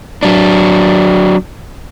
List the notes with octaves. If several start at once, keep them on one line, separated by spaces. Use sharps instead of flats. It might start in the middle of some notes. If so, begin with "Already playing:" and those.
F#3 D4